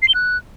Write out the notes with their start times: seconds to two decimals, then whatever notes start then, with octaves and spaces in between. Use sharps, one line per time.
0.02 C7
0.08 G7
0.15 F#6